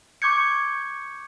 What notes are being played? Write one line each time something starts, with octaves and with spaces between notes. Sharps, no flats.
C#6 D6 G6 G#6 C#7